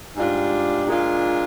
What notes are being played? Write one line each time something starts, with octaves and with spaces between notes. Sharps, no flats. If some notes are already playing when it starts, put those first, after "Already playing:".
G#2 G3 D4 F4
A#2 G#3 D4 F4